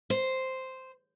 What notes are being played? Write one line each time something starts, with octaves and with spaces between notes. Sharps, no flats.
C5